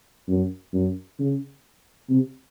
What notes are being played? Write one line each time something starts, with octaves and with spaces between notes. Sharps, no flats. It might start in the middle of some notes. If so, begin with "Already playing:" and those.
F#2
F#2
C#3
C3